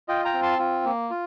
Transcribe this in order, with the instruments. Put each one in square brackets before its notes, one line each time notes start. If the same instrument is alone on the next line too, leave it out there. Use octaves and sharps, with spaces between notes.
[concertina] F4 D#5 G5
G5 A#5
C4
A5 C6
F4
A#3
F4